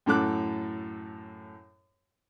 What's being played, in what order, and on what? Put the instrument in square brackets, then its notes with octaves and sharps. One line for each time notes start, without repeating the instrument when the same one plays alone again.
[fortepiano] F#2 A2 A4 D6 F#6